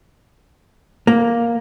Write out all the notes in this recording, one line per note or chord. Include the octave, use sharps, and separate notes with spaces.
A#3